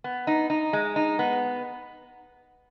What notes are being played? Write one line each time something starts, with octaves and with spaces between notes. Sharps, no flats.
B3
D#4
D#4
G#3
D#4
B3